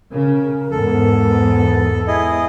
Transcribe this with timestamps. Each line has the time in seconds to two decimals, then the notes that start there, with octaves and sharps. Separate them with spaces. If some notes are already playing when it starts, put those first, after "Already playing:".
0.12 C#3 A#4
0.71 E2 G#2 B3 A4
2.08 E4 G#4 D#5